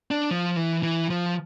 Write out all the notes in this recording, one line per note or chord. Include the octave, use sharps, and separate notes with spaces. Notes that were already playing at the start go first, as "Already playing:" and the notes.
D4
F3
E3
E3
F3